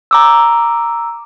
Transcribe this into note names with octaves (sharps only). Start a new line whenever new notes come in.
A#5 D6 E6